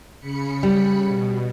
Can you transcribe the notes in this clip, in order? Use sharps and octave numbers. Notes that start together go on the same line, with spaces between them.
C#3 B5 C#7
G3
B2